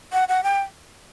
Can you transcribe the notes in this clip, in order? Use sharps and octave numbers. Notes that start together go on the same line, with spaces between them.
F#5
F#5
G5